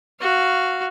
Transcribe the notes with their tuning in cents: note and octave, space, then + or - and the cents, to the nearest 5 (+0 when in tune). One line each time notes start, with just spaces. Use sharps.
F#4 +0 F5 -10